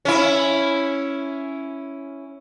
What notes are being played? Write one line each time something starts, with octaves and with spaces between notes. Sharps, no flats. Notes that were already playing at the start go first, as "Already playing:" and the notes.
C#4 E4